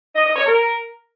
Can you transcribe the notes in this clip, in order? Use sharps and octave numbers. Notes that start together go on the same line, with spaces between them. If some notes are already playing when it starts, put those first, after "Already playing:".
D#5
D#5
C#5
A#4